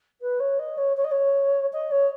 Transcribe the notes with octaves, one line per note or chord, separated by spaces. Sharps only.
B4
C#5
D#5
C#5
C#5
D#5
C#5
D#5
C#5